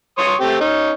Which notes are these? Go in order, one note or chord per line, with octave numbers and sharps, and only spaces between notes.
C#5 C6 D#6
A3 C4 G4
C#4 D#4